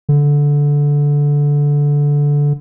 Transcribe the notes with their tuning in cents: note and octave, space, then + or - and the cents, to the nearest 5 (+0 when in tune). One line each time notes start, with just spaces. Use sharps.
D3 -15